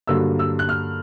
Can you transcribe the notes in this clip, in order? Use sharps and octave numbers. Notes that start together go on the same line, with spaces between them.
G2 D3 F#3 A#3 E6
E6
F#6
F6